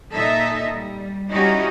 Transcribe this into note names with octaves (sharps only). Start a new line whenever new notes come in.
A#2 D#4 A4 E5
G3
G3 C#4 D#4 E4 F#4 G4